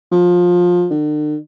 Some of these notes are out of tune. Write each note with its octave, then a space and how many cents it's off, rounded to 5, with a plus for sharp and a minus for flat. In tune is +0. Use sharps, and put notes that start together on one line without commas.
F3 +20
D3 +45